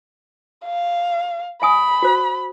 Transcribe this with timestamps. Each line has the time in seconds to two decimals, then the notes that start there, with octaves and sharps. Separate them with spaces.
0.65 F5
1.62 E5 G#5 B5 D#6
2.02 F#4 C5